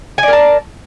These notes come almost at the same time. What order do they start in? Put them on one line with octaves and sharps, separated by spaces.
G#5 D5 A#4 A5